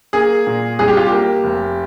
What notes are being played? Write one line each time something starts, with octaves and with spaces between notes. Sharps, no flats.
A#3 G#4
A#2
C2 G#4
G4
F4
A#3 G4
F1